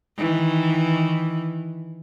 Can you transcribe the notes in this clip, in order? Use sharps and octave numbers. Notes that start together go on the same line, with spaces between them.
D#3 E3